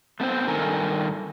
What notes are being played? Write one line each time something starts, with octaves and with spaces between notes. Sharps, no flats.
A3 B3 C4 C5
G2 D#3 A4 A#4 G#5 A#5